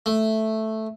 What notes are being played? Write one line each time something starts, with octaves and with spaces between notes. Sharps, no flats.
A3